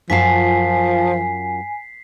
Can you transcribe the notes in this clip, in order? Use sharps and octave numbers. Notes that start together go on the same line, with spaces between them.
F#2 F3 F4 G#5 A5 B6 C7